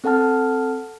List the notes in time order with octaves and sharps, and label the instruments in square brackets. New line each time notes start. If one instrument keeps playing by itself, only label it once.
[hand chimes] C4 A4 F#5 A5 F6